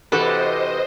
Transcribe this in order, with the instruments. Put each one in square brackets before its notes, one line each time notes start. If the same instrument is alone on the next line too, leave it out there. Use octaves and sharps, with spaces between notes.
[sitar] C3 E3 G4 [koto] F#4 A4 B4 [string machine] C5 D#5